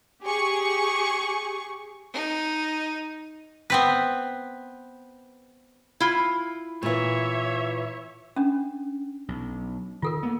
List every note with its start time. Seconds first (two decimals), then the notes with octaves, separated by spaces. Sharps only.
0.22 G4 G#4 C#6
2.13 D#4
3.70 B3 C4 B4
6.00 E4 F4
6.83 A#2 E3 C#5 E5
8.36 C#4 D4
9.28 B1
10.02 D#3 F4 A4 A#4
10.23 A#3 B3